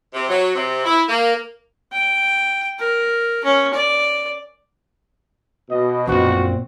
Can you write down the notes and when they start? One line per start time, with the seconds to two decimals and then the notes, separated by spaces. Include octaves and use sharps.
0.14 C3
0.29 F#3
0.55 C3
0.86 E4
1.09 A#3
1.93 G5
2.79 A#4
3.44 C#4
3.74 D5
5.71 B2 D#5
6.07 A#1 F#2 A#2 C4 F#4